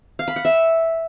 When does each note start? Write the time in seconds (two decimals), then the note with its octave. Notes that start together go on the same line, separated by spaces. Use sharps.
0.19 F5
0.28 B5
0.36 F#5
0.45 E5